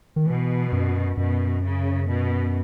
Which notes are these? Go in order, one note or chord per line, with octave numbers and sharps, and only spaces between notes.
D#3
B2 E3
F#2
F#2 B2
C#3
B2